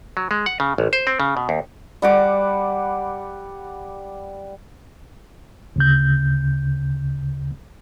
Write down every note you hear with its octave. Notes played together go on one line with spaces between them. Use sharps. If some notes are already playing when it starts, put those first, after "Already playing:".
F#3
G#3
F#5
C#3
A1
C5
C4
C#3
B2
D#2
G3 F#5 D6
D2 C#3 G6